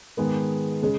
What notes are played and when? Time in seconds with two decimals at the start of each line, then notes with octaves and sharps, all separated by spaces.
0.17 G#2 D#3 G#3 B3
0.82 C#3 G#3 C#4